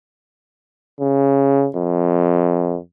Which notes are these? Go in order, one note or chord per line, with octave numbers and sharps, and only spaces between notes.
C#3
F2